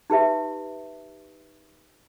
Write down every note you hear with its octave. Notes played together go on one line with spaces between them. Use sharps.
D#4 G4 B4 E5